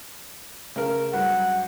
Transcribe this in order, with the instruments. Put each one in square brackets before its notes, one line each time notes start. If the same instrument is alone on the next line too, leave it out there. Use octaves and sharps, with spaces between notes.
[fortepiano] C#3 A#4
[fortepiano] G2 F#3 [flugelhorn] F#5